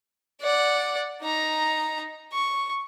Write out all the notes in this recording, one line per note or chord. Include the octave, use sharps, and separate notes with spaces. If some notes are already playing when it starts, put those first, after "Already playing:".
D5 F#5
D#4 A#5
C#6